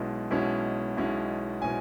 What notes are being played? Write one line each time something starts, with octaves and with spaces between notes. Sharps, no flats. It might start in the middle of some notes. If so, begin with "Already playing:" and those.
Already playing: B1 B2 G#3 C#4 E4
B1 B2 G#3 C#4 E4
B1 B2 G#3 C#4 E4
B2 G#3 C#4 E4 G#5